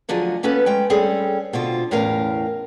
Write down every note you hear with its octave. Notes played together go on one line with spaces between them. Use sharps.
D2 D3 F3 F#3 G#4 D#5
A#3 B3 C#4 A4 B4
G#3 C#4 G5
G3 C4 C#4 G#4 A4
B2 D3 C4 F4
E2 A2 C#4 A#4 F5